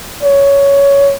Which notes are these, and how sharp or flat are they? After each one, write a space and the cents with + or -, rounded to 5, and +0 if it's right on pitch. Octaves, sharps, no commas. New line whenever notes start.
C#5 +10